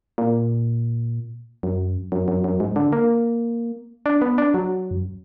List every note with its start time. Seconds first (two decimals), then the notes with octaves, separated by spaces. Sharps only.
0.18 A#2
1.63 F#2
2.12 F#2
2.28 F#2
2.44 F#2
2.60 G#2
2.76 D3
2.93 A#3
4.06 D4
4.22 B3
4.38 D4
4.54 F#3
4.91 F#2